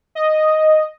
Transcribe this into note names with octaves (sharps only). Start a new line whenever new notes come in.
D#5